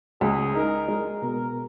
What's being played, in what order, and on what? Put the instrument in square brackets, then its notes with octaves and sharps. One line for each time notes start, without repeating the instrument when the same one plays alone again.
[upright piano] C#2 [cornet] G#4
[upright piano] D#4 [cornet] A#4
[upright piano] G#3
[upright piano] B2 [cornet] A#4